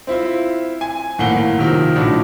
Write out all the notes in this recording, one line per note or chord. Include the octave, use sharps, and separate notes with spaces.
C4 E4 F4
G#5
G#1 A2 A#3 F#5 G7
C3 D#3 F3
A#1 A2 D4 F#4